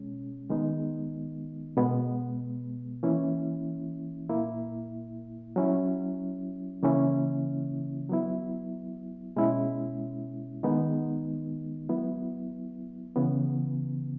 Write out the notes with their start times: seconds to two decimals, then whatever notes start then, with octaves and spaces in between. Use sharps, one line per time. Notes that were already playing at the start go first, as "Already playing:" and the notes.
Already playing: B2 G#3 C#4
0.50 D#3 G#3 B3 D#4
1.77 B2 G#3 B3
3.03 E3 A#3 C#4 E4
4.29 A#2 A#3 E4
5.56 F#3 C#4 E4
6.83 C#3 E3 A#3 C#4 E4
8.09 F#3 B3 E4
9.36 B2 G#3 C#4 E4
10.63 D#3 G#3 B3 D#4
11.89 F#3 B3 E4
13.16 C#3 E3 B3